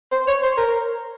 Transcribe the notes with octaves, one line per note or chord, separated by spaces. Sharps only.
C5
C#5
C5
A#4